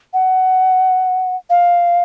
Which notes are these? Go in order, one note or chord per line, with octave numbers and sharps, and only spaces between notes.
F#5
F5